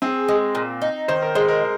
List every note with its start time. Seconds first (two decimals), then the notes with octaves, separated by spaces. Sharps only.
0.02 C4 G#4
0.28 G#3
0.55 A#2
0.82 D#4
1.08 D#3 C5
1.22 A#4
1.35 G#3 C5
1.48 A#4